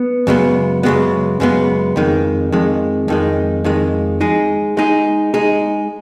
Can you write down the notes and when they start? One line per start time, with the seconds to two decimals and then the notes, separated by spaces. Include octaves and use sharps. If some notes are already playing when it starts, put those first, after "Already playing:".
Already playing: B3
0.27 F#2 C#3 G#3 B3
0.83 F#2 C#3 G#3 B3
1.40 F#2 C#3 G#3 B3
1.96 F2 D#3 G#3
2.52 F2 D#3 G#3
3.08 F2 D#3 G#3
3.64 F2 D#3 G#3
4.21 G#3 D#4 G#4
4.77 G#3 D#4 G#4
5.34 G#3 D#4 G#4